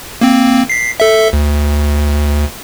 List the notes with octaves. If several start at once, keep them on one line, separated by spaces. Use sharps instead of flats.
A#3 C4
B6 C7
A4 E5
D2